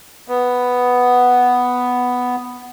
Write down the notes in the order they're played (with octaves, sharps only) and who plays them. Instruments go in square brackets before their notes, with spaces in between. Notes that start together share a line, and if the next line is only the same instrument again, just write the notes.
[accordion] B3